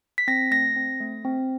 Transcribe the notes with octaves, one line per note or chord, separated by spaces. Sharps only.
B6
C4 A#6
A3 A#6
C4
A3
C4